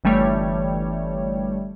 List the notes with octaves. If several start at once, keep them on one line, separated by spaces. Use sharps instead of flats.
G1 E3 G3 A3 C#5